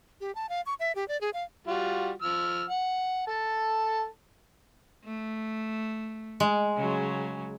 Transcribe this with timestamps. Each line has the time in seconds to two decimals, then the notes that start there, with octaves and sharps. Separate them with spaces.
0.21 G4
0.35 A5
0.49 F5
0.66 C#6
0.80 E5
0.95 G4
1.08 D5
1.21 G#4
1.34 F5
1.67 G3 F4 F#4
2.22 F3 E6 F6
2.70 F#5
3.27 A4 A5
5.04 A3
6.40 G#3
6.77 C#3 F#3 C#4